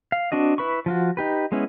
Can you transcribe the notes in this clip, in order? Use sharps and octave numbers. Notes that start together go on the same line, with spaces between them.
F5
C4 D4 F#4 D#5
E4 B4 B5 C#6
F3 F4 F#4
D#4 G4 B4
G#3 B3 C#4 E4